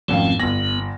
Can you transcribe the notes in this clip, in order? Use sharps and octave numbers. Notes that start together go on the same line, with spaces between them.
G#1 F2 A3 C4 C#4 F5
G1 B3 A#6